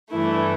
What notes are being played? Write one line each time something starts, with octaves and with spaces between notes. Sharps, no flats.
G2 E3 A3 E4